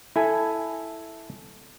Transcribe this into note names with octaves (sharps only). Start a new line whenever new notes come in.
E4 A4 G#5